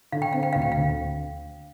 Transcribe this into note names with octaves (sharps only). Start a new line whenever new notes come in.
D3 F5
G5
C4 F5
G5
D2 F5
G5
F5
D2